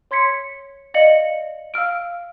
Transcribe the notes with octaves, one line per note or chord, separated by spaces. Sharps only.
C#5 C6 G#6 B6 C#7
D5 D#5 F5 C#7 F#7
F5 E6 F6 D7